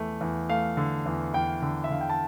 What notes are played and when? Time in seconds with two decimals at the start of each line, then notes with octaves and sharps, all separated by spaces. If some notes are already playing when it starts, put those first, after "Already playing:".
Already playing: E2 A3
0.21 E2
0.49 A3 F5
0.77 D3
1.06 E2
1.33 E2 G5
1.62 D3
1.84 E5
1.90 D3 F5
2.01 G5
2.09 A5